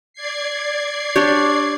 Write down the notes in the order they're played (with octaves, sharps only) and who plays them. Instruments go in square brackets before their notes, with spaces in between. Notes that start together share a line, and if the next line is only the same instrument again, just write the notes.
[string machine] D5 G#6 C7
[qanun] D4 G4 C#5